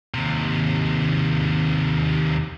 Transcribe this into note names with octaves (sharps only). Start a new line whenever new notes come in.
D#2 C3